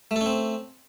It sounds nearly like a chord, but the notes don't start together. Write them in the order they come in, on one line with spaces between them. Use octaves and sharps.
A3 A4 C#4 C4